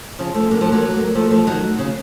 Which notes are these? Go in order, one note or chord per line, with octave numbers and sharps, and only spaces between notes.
C#3 F3
F3 A3
F#3 A#3
F3 A3
F#3 A#3
A#3
F3 A3
F3 A3
D#3 F#3
C#3